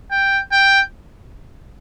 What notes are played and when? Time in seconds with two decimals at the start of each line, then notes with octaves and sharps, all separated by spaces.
0.11 G5
0.52 G5